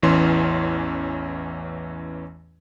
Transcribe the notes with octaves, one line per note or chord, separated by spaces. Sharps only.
A1 E2 E3 C#4 C6